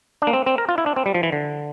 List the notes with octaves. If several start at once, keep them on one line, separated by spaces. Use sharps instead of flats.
D4
A#3
C4
C4
A#4
F4
E4
D4
C4
G3
F3
E3
D3